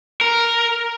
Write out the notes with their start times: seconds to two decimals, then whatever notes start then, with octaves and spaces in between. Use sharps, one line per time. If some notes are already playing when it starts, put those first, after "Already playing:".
0.21 A#4